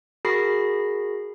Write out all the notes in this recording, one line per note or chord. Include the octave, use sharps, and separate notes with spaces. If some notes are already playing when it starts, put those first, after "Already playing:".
F#4 G#4 A#4 B5 A#6 C7